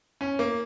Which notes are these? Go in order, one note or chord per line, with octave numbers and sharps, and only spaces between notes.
C#4
A#3